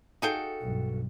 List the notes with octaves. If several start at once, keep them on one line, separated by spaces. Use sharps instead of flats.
D#4 F#4 G#4 A4 F5 G5
B1 G2